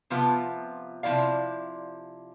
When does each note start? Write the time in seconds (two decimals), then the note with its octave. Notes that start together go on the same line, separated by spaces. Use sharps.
0.10 C3 F3 B3 F4 B4
1.03 C3 F3 E4 D5 F5